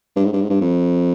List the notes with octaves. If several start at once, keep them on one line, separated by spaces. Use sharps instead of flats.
G2
G#2
G2
G#2
G2
F2